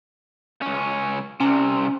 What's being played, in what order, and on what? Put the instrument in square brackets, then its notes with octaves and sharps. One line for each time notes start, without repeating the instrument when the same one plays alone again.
[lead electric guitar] C#2 C#4
[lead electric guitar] C2 C3 [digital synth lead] C#4